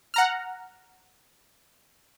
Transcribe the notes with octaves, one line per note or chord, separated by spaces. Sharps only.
F#5 A#5 F6